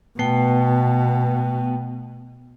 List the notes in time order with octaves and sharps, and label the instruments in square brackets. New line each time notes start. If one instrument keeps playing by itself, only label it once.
[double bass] B2 [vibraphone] A3 G5 [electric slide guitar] B3